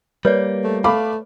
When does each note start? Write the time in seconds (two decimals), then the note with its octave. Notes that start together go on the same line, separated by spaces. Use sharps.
0.25 G3 A#3 B4 C#5 D5
0.64 A3
0.84 A3 F5 B5 D6